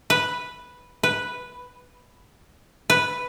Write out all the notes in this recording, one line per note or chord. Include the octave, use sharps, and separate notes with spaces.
B4
B4
B4